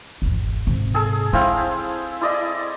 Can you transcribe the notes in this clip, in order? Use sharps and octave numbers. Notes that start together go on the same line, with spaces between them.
G#1 E2
G#2 C3
G#4 A4
C4 D#4 E4 F5
E4 D5 D#5